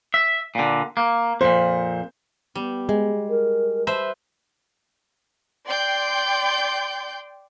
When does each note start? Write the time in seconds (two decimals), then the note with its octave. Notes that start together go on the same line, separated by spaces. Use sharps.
0.14 E5
0.55 A#2 D3
0.97 A#3
1.41 F2 A#2 C5
2.55 G3 B3
2.89 G#3
3.29 A#4
3.87 B4 C5 E5
5.66 D5 G5 C6 G6